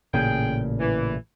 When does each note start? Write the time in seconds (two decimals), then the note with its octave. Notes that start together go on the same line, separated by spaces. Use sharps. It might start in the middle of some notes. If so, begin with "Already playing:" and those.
0.14 A1 A#2 C#3 G#4 G5
0.80 E3